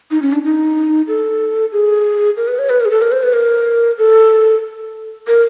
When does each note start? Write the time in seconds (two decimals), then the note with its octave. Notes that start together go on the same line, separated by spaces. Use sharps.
0.11 D#4
0.22 C#4
0.33 D4
0.44 D#4
1.08 A4
1.72 G#4
2.37 A#4
2.48 B4
2.59 C#5
2.69 B4
2.80 A#4
2.85 G#4
2.90 A4
3.02 A#4
3.12 C5
3.23 B4
3.34 A#4
3.98 A4
5.27 A#4